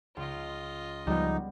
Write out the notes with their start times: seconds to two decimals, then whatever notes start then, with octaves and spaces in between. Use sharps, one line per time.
0.17 C#2 F4 D#5
1.07 C#2 F3 G3 B3 D#4